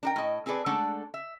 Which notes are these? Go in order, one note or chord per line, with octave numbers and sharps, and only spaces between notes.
D4 A#4 G5
A2 D#5
C4 G#4 A4 B4 D5
G#3 A3 D4 A4 D5 F#5
E5